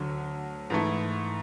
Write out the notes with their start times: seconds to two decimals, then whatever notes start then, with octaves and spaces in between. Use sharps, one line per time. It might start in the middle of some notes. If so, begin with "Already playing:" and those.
Already playing: D2 D3 F#3
0.70 G#2 E3 A3